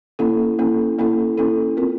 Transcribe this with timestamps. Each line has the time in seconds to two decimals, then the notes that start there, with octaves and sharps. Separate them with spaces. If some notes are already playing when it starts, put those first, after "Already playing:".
0.19 A#3 C#4 E4 A4
0.59 A#3 C#4 E4 A4
0.99 A#3 C#4 E4 A4
1.38 A#3 C#4 E4 A4
1.77 C4 F4 A#4